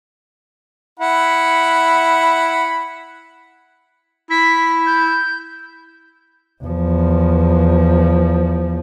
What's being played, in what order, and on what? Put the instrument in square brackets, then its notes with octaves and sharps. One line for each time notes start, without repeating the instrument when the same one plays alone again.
[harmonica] E4 F#5 B5
[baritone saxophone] E4 [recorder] B6
[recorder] G6
[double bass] E2 F3